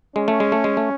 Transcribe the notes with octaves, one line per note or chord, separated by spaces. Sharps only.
G#3 C#4
A3
G#3
A3
G#3
A3